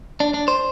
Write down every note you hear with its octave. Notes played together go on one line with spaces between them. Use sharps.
D4
D4
C5